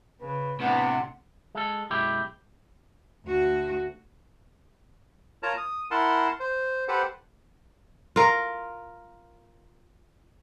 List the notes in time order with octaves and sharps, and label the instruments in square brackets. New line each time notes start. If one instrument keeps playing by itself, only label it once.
[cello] C#3 [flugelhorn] B4
[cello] A2 D4 [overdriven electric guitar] C3 [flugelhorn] B3 [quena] F#5
[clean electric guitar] G#3 A4
B1 F#2 G#3 E4 G4
[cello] D2 F#4
[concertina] F4 A#4 C#5 A5 A#5
D#6
E4 A#4 F#5 A5 C6
C5
G4 A4 B4 C5 F#5
[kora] F4 A#4